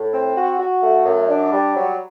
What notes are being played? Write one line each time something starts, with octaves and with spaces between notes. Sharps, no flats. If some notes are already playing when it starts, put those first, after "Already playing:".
Already playing: A2
C4
F#4
F#4
A3
F#2
D4
G3
F#3